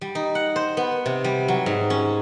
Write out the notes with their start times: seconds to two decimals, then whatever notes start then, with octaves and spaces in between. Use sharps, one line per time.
0.01 G3
0.15 D#4
0.35 F#5
0.56 C5
0.77 B3
1.06 C3
1.24 G3
1.48 F#3
1.66 G#2
1.90 C#4